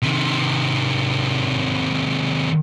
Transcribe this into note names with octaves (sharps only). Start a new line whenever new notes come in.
C3 D#3